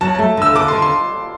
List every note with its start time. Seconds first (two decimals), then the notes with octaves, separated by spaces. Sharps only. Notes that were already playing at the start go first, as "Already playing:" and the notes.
0.01 F#3 A5
0.15 A3 A5
0.37 D3 E6
0.55 D3 D6
0.68 D3 C6
0.82 C6